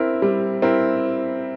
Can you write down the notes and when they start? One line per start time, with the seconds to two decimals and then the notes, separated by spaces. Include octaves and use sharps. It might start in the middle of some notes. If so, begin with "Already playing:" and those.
Already playing: C4 E4 A#4
0.22 G3
0.62 C4 E4 A#4